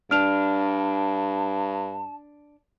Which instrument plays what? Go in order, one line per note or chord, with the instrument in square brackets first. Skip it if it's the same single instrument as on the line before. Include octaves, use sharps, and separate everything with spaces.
[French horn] G2 [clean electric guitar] D4 [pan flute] A5 [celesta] F6 F7